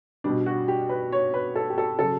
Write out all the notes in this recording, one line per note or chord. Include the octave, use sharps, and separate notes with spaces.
B2 G3 D4
F#4
G4
B4
C#5
B4
A4
G4
A4
C#3 F#3 A4